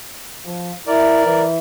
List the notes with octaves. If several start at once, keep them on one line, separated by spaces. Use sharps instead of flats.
F3
E4 A#4 D5
E3